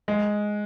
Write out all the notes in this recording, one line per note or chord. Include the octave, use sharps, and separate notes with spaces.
G#3